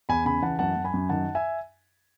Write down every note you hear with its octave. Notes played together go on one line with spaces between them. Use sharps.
E2 G#5 B5
C#3 G#5 B5
E3 F#5 A5
F#2 F#5 A5
F#2
G#5 B5
F#2
D#3 F#5 A5
E5 G#5